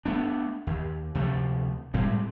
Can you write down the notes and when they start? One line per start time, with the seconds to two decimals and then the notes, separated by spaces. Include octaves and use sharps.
0.05 A3 B3 D4
0.67 D#2
1.15 D2 C3 F3 A3
1.94 A2 G3 G#3 C4